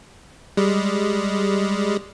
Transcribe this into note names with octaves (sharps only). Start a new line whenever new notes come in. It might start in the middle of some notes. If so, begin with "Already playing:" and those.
G3 G#3